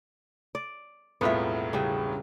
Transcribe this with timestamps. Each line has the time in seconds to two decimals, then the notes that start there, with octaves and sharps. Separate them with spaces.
0.55 D5
1.21 E1 C2 A2 B3 F4 E5
1.73 C#3 G3 D4